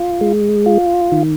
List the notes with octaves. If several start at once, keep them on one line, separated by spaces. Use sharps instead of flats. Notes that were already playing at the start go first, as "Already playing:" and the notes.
Already playing: F4
G#3
F4
D#3